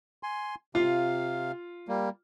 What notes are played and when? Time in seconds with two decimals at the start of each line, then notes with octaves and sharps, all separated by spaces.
0.23 G#5 C6
0.75 C3 F4 F5
1.88 G3 A#3